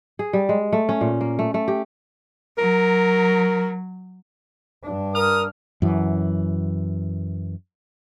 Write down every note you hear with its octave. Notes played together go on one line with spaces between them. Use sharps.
G#4
G3
G#3
A3
C#4
A#2
A#3
A3
A3
G4
F#3 A#4
G2 D4
A#4 D#6 F6
F#2 E3